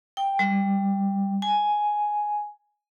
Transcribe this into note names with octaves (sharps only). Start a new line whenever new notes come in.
G5
G3
G#5